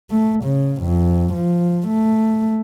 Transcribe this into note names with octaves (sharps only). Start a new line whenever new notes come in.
A3
C#3
F2
F3
A3